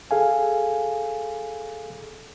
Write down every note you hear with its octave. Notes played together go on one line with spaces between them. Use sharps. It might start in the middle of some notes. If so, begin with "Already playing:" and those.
G#4 A4 F5 G#5